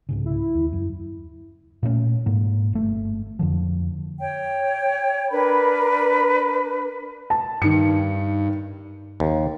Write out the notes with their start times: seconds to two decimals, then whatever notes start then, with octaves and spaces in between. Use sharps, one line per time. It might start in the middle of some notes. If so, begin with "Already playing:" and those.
0.09 C2 G#2 C#3
0.26 E4
0.55 D#2
0.73 F#2
1.83 A#2 A3 A#3 C#4
2.26 G#2 A#3
2.73 G1 A3
3.39 F2 D3 F3
4.19 C#5 G5
5.31 D4 A#4 B4 B5
7.30 A5
7.62 G2 D#3 C#7
9.20 D#2